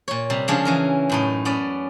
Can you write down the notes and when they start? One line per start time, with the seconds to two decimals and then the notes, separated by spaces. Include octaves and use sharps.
0.08 A#2 C#5
0.30 C3 G3
0.48 C#3 F3 G#3 D4 G#4 C#5
0.65 E3 C#4 A#4
1.09 F#2 A2 D#4
1.45 B3 C#4 D5